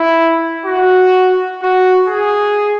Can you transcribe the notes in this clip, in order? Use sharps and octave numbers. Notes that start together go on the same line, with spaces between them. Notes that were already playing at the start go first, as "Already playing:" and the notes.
Already playing: E4
F#4
F#4
G#4